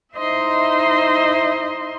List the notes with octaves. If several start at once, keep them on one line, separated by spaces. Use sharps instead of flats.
D#4 E4 C5 D#5 E5 C6